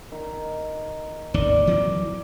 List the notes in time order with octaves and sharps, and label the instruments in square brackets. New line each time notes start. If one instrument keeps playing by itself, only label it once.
[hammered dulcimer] D#3
[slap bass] G#1 D#2 D#3 [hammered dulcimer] D5
[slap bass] E3 F#3 C4